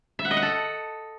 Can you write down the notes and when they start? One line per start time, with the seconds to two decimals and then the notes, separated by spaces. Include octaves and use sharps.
0.19 E5
0.25 F#5
0.31 D#5
0.37 F#5
0.42 A4